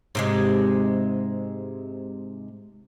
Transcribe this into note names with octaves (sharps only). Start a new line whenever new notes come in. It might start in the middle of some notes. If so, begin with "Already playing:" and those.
G#2 C3 G#3